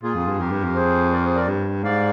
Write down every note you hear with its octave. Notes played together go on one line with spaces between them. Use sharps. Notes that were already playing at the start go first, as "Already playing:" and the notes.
A#2 F4 G#4
F2
G2
F2 G4 A#4
G2
F2
G#4 C5
A#4 D5
G#4 C5
A#4 D5
G2
G#2 D5 F5